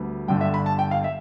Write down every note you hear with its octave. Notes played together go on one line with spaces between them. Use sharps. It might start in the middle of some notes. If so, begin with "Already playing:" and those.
Already playing: D2 D3 G3 B3
G1 G2 D3 G5
E5
B5
A5
G5
F5
E5